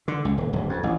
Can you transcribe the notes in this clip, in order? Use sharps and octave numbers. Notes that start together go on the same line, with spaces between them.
D3
C#2
D#1
D1
F2
A1